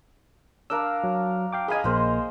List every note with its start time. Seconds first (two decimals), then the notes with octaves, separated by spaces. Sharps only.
0.70 D4 A#4 F5 E6
1.04 F#3
1.53 F5 G5 D6
1.68 G#4 D#5 F5 G#5 B5
1.84 A#1 G#3 A#3 C5